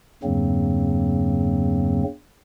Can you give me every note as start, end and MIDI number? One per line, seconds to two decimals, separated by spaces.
0.23 2.03 40
0.23 2.03 43
0.23 2.03 49
0.23 2.03 54
0.23 2.03 58
0.23 2.03 60